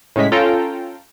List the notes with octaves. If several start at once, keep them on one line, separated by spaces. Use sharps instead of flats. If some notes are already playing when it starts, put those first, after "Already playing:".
A2 C#3 G#3 B6
C#4 F4 A4 G5 A#5